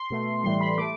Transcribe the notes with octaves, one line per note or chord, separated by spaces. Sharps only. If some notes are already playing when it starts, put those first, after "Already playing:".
Already playing: C6
B2 A3
A2 E3 G3 C6
B5
A3 D6